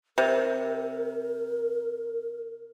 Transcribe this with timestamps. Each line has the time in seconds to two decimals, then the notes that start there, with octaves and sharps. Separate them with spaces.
0.18 C3 A#4